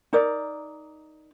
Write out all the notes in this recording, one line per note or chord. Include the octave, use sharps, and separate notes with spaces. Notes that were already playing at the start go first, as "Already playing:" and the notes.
D#4 A#4 D5